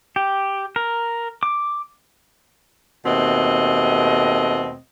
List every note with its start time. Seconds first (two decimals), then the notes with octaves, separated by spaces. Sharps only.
0.16 G4
0.76 A#4
1.43 D6
3.05 D#2 B2 A3 C4 D#5